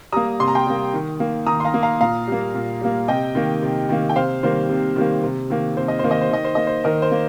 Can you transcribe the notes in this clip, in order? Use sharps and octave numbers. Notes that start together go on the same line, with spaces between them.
G3 A#3 A#5 D#6
C3 C6
A#5
G5 C6
G3 A#3
D#3
A#3
D#3 A#5 D#6
C6
F5 A#5
A#3
F5 A#5
A#2 F5 A#5
G3 A#3
A#2
G3 A#3
C3 D#5 G5
D#3 A#3
C3
D#3 A#3
G5
C3 C5 F5
D#3 G3 A#3 C5
C3
D#3 G3 A#3
C3
D#3 A#3
C3 C5
D#5
D#3 A#3 C5
D#5
C5
D#3 D#5
C5
A#3 D#5
C5
D#3 A#4 D#5
C5
A#3